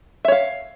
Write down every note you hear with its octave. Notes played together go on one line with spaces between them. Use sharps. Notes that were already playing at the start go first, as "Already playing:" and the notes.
C#5 E5 F5